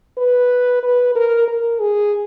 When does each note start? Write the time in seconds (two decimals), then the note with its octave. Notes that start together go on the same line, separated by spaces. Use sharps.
0.18 B4
0.83 B4
1.15 A#4
1.48 A#4
1.80 G#4